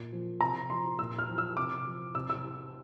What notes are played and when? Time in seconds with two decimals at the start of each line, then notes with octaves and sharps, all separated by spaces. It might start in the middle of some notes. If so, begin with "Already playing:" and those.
Already playing: A#2
0.12 F3
0.41 C3 A#5
0.70 F3 C6
0.99 A#2 E6
1.19 F6
1.29 F3
1.38 E6
1.57 C3 D6
1.86 F3
2.15 C3 E6
2.30 E6